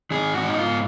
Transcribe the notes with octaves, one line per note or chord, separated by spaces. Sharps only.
D#3 G#4
G#2 F#4
D#4
G#2 F4